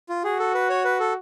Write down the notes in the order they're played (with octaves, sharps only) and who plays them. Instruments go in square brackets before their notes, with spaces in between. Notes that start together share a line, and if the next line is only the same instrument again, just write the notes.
[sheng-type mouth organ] F4
[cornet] F#4 [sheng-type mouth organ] G#4
[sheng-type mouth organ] A4
B4
C#5
B4
A4